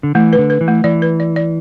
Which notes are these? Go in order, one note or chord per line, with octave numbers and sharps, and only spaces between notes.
D3
E3 A3
B4
D3
B4
E3
A3
E3 D5
B4
D5
D5